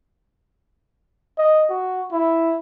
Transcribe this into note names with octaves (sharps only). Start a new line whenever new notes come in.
D#5
F#4
E4